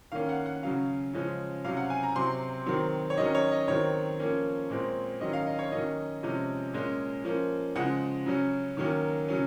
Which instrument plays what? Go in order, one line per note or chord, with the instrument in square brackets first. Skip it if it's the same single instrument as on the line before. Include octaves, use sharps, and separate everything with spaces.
[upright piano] D#3 A#3 C#4 F5
F#5
F#5
C#3 F#3 C#4 F5
C#3 F3 G#3 C#4
C3 F#3 C#4 F5
F#5
G#5
A#5
C3 F#3 C4 C6
D#3 F#3 C4
C#5
D#3 F#3 C#4 D#5
C#5
D#5
D#3 F#3 C4 C#5
F3 A#3 C#4
A#2 G#3 C4
D#3 F#3 C#4 D#5
F5
D#5
C#5
D#3 F#3 A#3 C#4 D#5
C3 F3 G#3 C#4
A#2 G#3 C#4
F3 A#3 C#4
C#3 F3 G#3 F#5
C#3 F#3 C#4
D#3 F#3 A#3 C#4
C#3 F#3 C#4